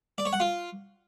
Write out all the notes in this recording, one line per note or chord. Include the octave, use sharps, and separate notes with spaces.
D5
C#5
F#5
F4